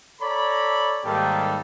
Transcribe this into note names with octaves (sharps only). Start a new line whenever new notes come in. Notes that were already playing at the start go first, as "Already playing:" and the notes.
A4 C#5 D5 A#5 B5
G#2 D#3 G3 A#3 G4 A4